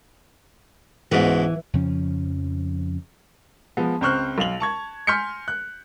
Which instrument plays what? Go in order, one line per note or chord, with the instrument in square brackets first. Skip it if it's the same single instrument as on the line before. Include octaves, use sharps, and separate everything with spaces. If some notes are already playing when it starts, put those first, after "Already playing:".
[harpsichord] C#2 G#2 B2 [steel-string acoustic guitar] E3
[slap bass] F2 C#3 F3 C#4
[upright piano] F3 G#3 B3
C#2 C4 C5 C#6 F6 F#6
B1 F5 F7 F#7
A5 C#6 G#6
G#5 C6 F6 G6 B6 C#7
F#6